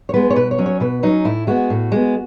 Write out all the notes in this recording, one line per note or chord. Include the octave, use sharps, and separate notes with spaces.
C#5
G#3 B3 B4
C#5
B2 B4
C#5
F#3 C#4
C#5
B2 B4
F#3 C#4 D#4
A2 E4
G#3 B3 F#4
A2
G#3 B3